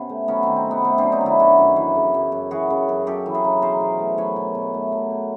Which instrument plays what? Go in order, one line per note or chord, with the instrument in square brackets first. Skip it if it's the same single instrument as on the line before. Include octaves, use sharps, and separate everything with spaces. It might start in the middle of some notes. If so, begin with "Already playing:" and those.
Already playing: [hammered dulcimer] C3 B3 C#4
A3
F#3 B3 C#4
D#3 C4
C4
C3 B3
A3 C4
C4 D4
F#3
C#4 D#4
D#3
D4 E4
F#2 E4 F#4
F#2
E3
C#3
F#2
F#2
E3 F#4 G#4
C#3
F#2
F#2 G4 A4
E3
G#4 A#4
C#3
B2 A#4 C5
B2
A3
F#3 B4 C#5
B2
B2
A3
F#3
B2